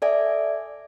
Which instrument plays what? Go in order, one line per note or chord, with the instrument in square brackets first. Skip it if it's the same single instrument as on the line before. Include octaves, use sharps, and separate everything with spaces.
[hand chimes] A4 D5 E5 G#5